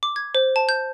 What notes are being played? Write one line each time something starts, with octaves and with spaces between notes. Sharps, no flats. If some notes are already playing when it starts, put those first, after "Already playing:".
D6
G#6
C5
A5
G6